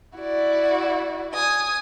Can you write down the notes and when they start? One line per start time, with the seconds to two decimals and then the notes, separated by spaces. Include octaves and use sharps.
0.18 E4 F#4 D5
1.35 G#5 D#6